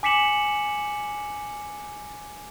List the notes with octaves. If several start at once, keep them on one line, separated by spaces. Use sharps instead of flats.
G#5 D6 B6 C#7 E7 F#7